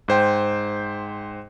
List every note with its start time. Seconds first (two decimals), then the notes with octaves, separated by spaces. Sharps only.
0.08 G#2 C5 G5